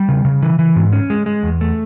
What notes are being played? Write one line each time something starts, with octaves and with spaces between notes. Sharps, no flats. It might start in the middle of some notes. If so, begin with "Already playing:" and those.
Already playing: G3
C#3
C#3
E3
E3
G#2
C#4
G#3
G#3
E2
A3